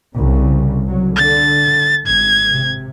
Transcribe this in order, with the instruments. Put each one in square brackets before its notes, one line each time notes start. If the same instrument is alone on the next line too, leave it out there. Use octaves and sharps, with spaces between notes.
[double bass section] C2 C#3
C2 F#3
[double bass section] D3 [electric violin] A6
[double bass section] G#1 [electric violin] G#6
[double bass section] C3